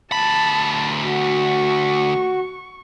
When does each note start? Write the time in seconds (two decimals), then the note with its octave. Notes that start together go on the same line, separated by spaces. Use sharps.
0.12 D2 A5 B5
1.04 F#4 C#6